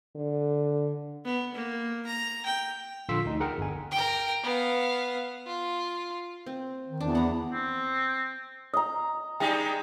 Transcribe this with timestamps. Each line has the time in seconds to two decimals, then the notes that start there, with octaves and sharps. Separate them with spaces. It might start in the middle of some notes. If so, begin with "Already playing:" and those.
0.16 D3
1.25 B3
1.54 A#3
2.06 A#5
2.46 G5
3.09 A#1 D3 F4 C6 E6 B6
3.25 D2 D#4
3.40 G#4 A#4 F#5 G5 A#5 F6
3.58 G1 D3 G#5
3.92 A#4 G5
4.43 B3 F5
5.46 F4
6.46 C4
6.87 D#3
7.00 E2 D4
7.15 B3 F#5 A#5
7.52 C4
8.74 D#5 A#5 D#6
9.40 G3 G#3 D#4 G5